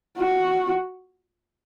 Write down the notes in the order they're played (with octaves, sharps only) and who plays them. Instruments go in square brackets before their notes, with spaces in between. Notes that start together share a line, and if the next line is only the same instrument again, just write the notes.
[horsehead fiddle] F#4